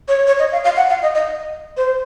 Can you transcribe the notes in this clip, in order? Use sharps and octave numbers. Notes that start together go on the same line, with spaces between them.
C#5
C#5
D#5
F5
F5
F#5
F5
D#5
D#5
C5